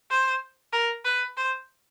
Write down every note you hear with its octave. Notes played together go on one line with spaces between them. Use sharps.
C5
A#4
B4
C5